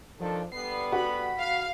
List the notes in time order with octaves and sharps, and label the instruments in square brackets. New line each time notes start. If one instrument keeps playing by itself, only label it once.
[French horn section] D#3 D4 A4 [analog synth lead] F3
[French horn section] D3 G3 B3 [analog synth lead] C7
[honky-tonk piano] F#4 [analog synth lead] B5
[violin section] F5